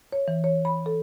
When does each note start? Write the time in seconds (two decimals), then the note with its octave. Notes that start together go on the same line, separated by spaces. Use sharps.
0.12 C#5
0.28 E3
0.44 C#5
0.65 B5
0.86 A4